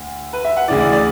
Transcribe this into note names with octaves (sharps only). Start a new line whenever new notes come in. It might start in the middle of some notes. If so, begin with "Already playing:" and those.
Already playing: D2 D3
B4
E5
F#5
D2 C#3 E3 D5
D5
D5